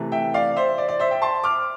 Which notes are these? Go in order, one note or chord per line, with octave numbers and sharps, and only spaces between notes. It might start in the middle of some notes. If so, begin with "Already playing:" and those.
Already playing: C3 E3 A3
E5 G5
D5 F5
C5 E5
D5
D5
C5 E5
E5 G5
A5 C6
D6 F6